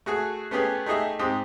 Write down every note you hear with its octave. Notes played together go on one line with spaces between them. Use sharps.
A3 F#4 G#4
A3 B3 C#4 G4 G#4
A3 D#4 G4 G#4 D#5 E5
G#2 C4 G4 D#6